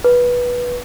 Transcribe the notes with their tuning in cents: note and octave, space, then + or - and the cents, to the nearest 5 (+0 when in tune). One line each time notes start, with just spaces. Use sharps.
B4 -15